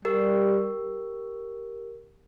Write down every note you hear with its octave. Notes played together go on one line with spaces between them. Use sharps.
G3 G4 A#4